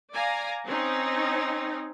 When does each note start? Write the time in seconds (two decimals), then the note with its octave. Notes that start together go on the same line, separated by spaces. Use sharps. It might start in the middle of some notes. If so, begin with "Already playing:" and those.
0.13 D5 F5 G#5 A#5
0.65 C4 C#4 D#4